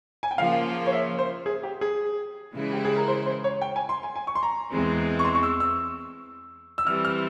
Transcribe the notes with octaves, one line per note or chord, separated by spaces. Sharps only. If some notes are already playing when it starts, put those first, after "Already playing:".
G#5
G5
C#3 F3 A#3 F4 F5
C#5
E5
C5
G#4
G4
G#4
C#3 E3 G#3 E4
G4
G#4
A#4
C5
C5
C#5
G5
G#5
C6
G#5
G#5
C#6
C6
A#5
E2 E3 G#3 C4
C#6
C6
C#6
E6
E6
E6
E3 G3 C4 F6
F6